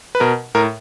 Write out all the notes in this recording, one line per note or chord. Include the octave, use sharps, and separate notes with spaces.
B4
B2 A#4
A2 A#4